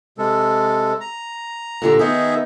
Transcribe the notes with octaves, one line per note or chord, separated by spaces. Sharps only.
C3 G#3 A4
A#5
A#2 D3 G4
D#3 B3 D#4 G#4 E5